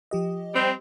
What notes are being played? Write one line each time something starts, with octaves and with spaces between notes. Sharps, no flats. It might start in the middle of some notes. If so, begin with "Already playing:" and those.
F3 G4 D#5
G3 C4